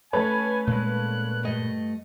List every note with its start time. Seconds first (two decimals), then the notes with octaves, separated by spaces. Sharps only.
0.13 A3 C#4 A4 B4 C#5 G#5
0.67 A#2 G#3 F#6
1.43 G2 A3 D#5